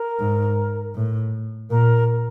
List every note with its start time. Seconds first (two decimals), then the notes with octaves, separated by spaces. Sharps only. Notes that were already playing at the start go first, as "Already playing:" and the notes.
Already playing: A#4
0.20 G#2
0.95 A2
1.70 A#2 A#4